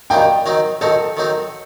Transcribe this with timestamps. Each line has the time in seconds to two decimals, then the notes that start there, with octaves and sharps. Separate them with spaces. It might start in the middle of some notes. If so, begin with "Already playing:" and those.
0.10 F#2 D#3 G3 A#3 D#4 G5
0.46 D#3 F#3 C4 D#4
0.81 D#3 F#3 C4 D#4 A4
1.17 D#3 F#3 C4 D#4